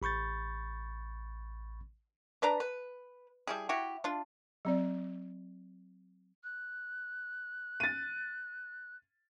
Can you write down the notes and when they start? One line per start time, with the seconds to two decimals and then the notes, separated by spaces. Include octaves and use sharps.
0.02 A1 B5 C#6 G6 A6
2.42 D4 B4 D5 A#5
2.60 B4
3.47 G3 E4 G#4
3.69 E4 F#4 G4
4.04 D4 F4
4.65 F#3 C4 D5
6.44 F#6
7.80 A6 D#7